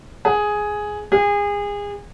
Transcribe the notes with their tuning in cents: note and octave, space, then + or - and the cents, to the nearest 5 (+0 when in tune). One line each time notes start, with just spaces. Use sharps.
G#4 +5
G#4 -30